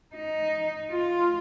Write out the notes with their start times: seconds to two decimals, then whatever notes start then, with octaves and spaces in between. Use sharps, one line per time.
0.15 D#4
0.91 F4